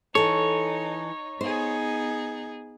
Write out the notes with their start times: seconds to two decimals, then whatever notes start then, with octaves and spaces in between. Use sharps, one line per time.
0.15 E3 D#4 A4 C#5
1.41 B3 D#4 G#4 C5